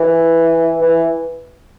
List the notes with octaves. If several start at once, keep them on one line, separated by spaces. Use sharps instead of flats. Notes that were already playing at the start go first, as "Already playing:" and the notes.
Already playing: E3
E3